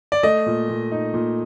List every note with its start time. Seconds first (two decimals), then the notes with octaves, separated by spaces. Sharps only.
0.12 D5
0.23 A3 D#5
0.46 A#2
0.69 A#2
0.92 D#4
1.14 A#2